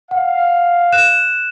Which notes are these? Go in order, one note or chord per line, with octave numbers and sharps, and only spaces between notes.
F5 F#5
F#6 E7